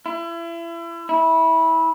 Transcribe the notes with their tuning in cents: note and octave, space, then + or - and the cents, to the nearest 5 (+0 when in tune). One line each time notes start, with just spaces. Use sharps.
E4 +35
E4 -20